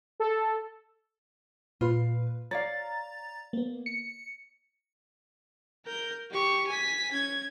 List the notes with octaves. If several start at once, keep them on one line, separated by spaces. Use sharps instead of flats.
A4
A#2 F4 B4
C#5 D5 F5 A#5 A6
A#3 B3
C#7
A#4 G6
G4 C#6
G#5 B6
C#4 G#6